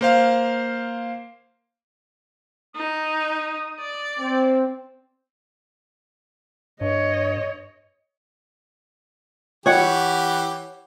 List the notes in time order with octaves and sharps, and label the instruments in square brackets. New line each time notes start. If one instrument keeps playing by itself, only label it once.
[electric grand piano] A#3 C5 F5
[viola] D#4 [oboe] D#6
[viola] D5
[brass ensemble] C4
[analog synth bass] G2 [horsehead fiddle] C#5 D#5
[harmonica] E3 G4 [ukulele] C#5 F#5